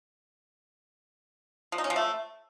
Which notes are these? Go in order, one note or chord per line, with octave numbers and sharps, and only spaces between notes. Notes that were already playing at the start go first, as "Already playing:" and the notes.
F3
D#4
C#4
F3
A3